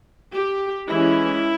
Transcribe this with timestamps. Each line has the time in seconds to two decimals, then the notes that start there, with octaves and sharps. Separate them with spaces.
0.34 G4
0.89 E3 G#3 C#4 E4